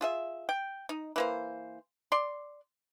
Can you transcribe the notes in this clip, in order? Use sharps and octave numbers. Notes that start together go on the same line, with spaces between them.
F4 G#4 E5
G5
D#4
E3 A#3 C5
D5 C6